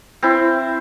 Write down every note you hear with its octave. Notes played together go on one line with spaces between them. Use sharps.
C4 E4